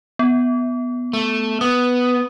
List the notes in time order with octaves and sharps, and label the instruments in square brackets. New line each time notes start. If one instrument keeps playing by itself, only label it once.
[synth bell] B3
[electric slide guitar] A3
[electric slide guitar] B3 [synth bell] D#6